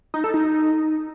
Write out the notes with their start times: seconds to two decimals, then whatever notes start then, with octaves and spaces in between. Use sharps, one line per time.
0.14 D#4
0.24 A4
0.34 D#4